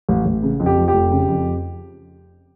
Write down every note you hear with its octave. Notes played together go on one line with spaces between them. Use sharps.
A1
A1
C#3
F2
G4
F3
G4
F1
C#3
F2